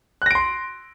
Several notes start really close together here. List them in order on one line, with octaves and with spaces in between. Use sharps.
F#6 A#6 D7 C6